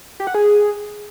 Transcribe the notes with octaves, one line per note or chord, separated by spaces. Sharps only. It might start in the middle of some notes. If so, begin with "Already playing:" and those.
G4
F#5
G#4